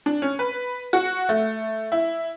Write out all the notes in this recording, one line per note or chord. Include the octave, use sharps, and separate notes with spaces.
D4
C#4
B4
F#4
A3
E4